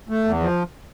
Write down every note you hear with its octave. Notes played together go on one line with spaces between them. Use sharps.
A3
E2
F3